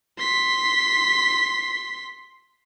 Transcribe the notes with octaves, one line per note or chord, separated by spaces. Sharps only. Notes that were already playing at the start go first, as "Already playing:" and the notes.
C6 B6